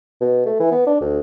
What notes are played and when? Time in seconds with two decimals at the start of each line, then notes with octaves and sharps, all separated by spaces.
0.21 B2
0.46 A3
0.60 E3
0.71 B3
0.87 D4
1.01 D2